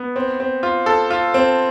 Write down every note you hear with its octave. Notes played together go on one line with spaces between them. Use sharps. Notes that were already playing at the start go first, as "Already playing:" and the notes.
Already playing: B3
C4
C4
F4
A4
F4
C4